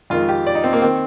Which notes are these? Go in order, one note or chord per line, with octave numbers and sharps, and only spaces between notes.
F2 D#3 G#3 F4
G4
D5
D#4
C4
A#3
D#3 C4